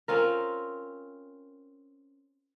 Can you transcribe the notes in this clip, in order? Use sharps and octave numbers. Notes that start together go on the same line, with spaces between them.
C4 C#4 F4 A#4